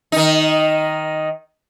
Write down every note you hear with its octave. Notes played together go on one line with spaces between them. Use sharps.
D#3 D#4